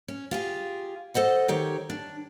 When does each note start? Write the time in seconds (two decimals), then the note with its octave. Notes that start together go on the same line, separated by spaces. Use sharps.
0.08 C#4
0.31 F4 G4 G#4
1.14 A4 C5 D#5 F#5
1.48 D#3 G4 C#5
1.90 D4